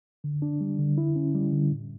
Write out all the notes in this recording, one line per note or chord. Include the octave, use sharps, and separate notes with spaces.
D3
D4
G3
D3
E4
C#4
G3
D3
A2